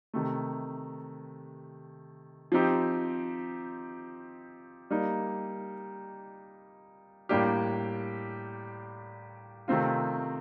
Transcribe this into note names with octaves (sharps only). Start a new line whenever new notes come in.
C3 D#3 A3
F3 C4 D#4 G4
G3 A#3 D#4
A2 G3 A#3 D4 G4
C3 D#3 A3 C4 F4